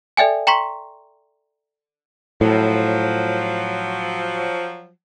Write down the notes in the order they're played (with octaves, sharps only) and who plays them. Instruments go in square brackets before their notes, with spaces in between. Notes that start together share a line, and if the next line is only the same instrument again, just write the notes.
[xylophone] A4 D5 E5 G5 G#5
G5 A#5 C6 C#6 B6
[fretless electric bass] A2 [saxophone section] F3 F#3